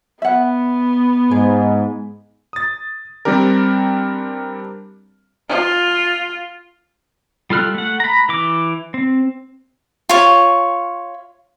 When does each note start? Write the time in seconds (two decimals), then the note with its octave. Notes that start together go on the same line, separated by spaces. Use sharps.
0.22 B3 E5 F#5
1.31 G#2 G#4
2.53 D#6 A6
3.25 G3 C4 D4 G4 A#4
5.49 F4
7.50 G3 F4 A4 F6 F#6
7.74 A3 F#5
8.00 A#5 B5
8.29 E3 D6
8.94 C4
10.09 F4 C#5